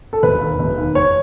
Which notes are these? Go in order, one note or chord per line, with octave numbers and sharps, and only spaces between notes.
A4
E1 B4
D#2 D#3
E1
D#2 D#3
F#1 C#5